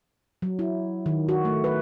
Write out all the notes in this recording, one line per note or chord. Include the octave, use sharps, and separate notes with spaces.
F#3
E4
D#3
F#4
A3
B4